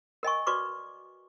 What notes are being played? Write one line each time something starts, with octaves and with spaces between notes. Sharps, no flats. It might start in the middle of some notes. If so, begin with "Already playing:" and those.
A#4 D#5 G#5 C#6
F#4 B4 D5 C#6 D6